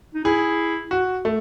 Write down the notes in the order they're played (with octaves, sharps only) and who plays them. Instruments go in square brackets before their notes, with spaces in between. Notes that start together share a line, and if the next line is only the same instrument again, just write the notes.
[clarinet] D#4
[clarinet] E4 [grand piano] G#4
[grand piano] F#4
A3